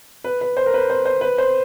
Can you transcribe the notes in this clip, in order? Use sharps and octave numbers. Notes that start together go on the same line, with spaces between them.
B4
B4
C5
A#4
B4
C5
C5
B4
C5